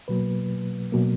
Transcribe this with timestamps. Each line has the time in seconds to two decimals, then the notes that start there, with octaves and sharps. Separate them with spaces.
0.08 B2 F#3 A#3 B4
0.92 B2 F#3 A#3